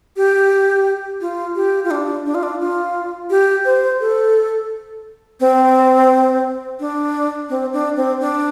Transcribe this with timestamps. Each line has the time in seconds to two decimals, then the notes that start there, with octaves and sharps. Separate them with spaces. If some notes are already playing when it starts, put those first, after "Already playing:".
0.17 G4
1.21 F4
1.56 G4
1.85 F4
1.91 D4
2.26 D4
2.35 F4
2.43 D4
2.61 F4
3.30 G4
3.65 C5
4.01 A4
5.40 C4
6.80 D4
7.50 C4
7.73 D4
7.97 C4
8.20 D4